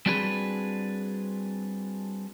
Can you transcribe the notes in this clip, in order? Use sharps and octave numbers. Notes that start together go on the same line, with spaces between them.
G3 C4 D4 F#4 G#4 B4